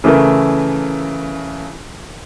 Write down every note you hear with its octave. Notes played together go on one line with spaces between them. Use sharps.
C#3 E3 A3 A#4